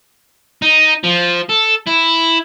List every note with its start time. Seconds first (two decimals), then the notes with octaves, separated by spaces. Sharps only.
0.62 D#4
1.04 F3
1.50 A4
1.87 E4